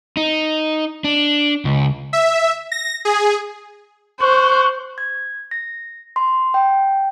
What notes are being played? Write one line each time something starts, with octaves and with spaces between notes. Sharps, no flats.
D#4
D4
C#2
E5
A#6
G#4
C5 C#6 F#6
G#6
A#6
C6
G5